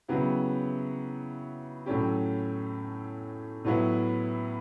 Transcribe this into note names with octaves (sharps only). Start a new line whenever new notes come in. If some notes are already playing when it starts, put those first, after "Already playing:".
C#3 F#3 B3 E4 G4
A2 F#3 A3 C#4 G4
A2 F#3 B3 E4